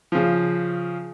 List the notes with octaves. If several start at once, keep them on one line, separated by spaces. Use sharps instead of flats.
C#3 F3